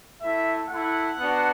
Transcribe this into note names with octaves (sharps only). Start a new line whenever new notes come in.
A3 E4 E5
A3 E4 F#5
B3 D4 F#4